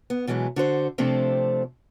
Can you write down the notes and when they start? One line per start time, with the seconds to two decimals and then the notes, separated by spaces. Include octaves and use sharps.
0.10 B3
0.27 B2 E3 F#3 G#3 E4
0.56 D3 F#4 C5
0.98 C3 F3 A3 C4 D4